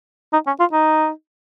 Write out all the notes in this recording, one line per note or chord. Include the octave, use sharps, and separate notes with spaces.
D#4
C#4
F4
D#4